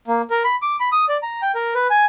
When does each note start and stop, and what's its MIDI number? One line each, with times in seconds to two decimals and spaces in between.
0.08 0.22 58
0.30 0.43 70
0.44 0.55 83
0.62 0.76 86
0.80 0.89 83
0.92 1.05 87
1.09 1.17 74
1.23 1.41 82
1.42 1.52 79
1.55 1.74 70
1.75 1.87 71
1.90 2.06 80